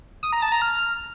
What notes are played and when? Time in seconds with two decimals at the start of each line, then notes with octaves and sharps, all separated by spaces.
0.23 D#6
0.33 A#5
0.42 A5
0.52 A#5
0.62 F6